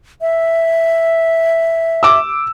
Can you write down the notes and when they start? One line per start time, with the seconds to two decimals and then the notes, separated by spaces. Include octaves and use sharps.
0.21 E5
2.03 D6 E6